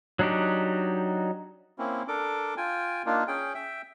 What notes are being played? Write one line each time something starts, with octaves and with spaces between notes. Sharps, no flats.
F#3 D4 D#4 F#4 G4
A#3 C4 C#4 E4
D4 A4 A#4 D6
F4 G5 G#5
A#3 D4 D#4 F4
C#4 G#4 G5
E5 G5